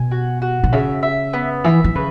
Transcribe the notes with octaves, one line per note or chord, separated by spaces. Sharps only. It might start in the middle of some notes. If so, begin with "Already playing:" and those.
Already playing: B2 G#5
F#4
F#4
B2
C#3 E5
E5
B3
E3 E5
E3
C#3 B4